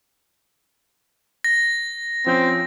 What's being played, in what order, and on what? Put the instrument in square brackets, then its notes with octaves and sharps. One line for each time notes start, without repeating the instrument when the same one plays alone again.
[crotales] A#6
[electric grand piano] F3 C#4 G6 [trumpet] C4